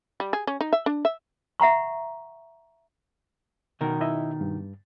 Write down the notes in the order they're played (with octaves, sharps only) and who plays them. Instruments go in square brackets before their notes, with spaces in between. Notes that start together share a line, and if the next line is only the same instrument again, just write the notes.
[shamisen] G3
G#4
C#4
D#4
E5
D4
E5
[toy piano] E5 F#5 A#5 C#6
[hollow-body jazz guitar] B2 D#3 A#4
[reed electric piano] E4 D#5 E5
G2